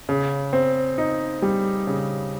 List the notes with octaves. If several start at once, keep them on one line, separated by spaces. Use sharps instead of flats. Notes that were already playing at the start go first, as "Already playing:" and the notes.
C#3
C4
D#4
G3
C#3